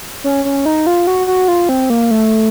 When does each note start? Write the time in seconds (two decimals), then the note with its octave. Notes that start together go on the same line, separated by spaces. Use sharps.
0.24 C#4
0.45 C#4
0.66 D#4
0.87 F4
1.07 F#4
1.27 F#4
1.48 F4
1.69 C4
1.90 A#3
2.11 A3